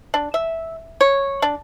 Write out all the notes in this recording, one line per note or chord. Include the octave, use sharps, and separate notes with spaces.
D4
E5
C#5
D4